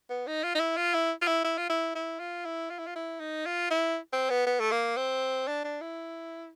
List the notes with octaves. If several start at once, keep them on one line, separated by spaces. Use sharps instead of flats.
B3
D#4
F4
D#4
E4
F4
E4
F4
E4
E4
F4
E4
E4
F4
E4
F4
E4
F4
E4
D#4
F4
E4
C4
B3
B3
A3
A#3
C4
D4
D4
E4